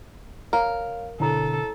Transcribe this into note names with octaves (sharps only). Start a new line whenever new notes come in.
A#4 C#5 F5
B2 D3 E4 A4 C#5 A#5